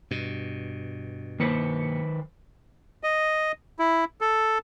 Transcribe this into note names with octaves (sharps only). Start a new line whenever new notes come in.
G2 B2
D#3 A#3 B4 C5 C#7
D#5
E4
A4